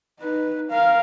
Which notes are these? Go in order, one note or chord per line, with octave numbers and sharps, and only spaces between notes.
D#4 B4
A#4 F5